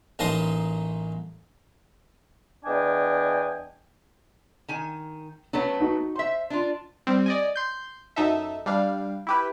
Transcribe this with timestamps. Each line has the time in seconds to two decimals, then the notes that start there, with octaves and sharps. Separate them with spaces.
0.19 A1 A#3 D#4 D#5 A5 C6
2.65 E2 D4 D#5 G5 G#5
4.69 D#3 G#5
5.53 F#3 A3 B3 C#4
5.80 D#4 F#4
6.16 C5 E5 C6
6.50 D4 F4
7.07 G3 C4
7.26 D5 D#5 G#5
7.56 C6 G6
8.16 F#2 D#4 A4 E5
8.66 G3 D4 F5
9.27 E4 G4 B4